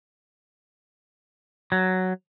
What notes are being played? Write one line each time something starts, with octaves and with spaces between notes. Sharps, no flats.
F#3